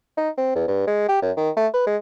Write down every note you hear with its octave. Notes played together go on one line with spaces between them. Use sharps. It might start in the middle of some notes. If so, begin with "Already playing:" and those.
D#4
C4
E2
G2
G#3
G4
F#2
D#3
A3
B4
G#3